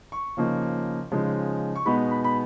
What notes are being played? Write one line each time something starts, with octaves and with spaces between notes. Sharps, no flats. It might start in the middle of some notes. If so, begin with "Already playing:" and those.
C#6
C#3 F3 A#3 D#4
C#3 F3 G#3 D#4
C#6
B2 G#3 B3 D#4 B5
B5
B5